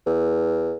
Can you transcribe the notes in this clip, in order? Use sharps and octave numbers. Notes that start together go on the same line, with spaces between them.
E2